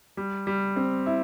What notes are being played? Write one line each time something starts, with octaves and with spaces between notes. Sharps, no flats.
G3
G3
C4
E4